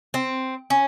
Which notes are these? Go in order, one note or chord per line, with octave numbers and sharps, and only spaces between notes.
C4
C#4